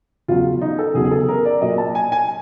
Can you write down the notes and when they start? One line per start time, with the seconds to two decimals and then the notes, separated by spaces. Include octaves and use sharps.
0.28 E2 C#3 F#3 F4
0.61 D#4
0.79 A4
0.94 E2 C#3 F#3 G#4
1.05 G#4
1.11 A4
1.28 A#4
1.45 D5
1.61 A#2 F#3 D#5
1.78 A5
1.95 G#5
2.12 G#5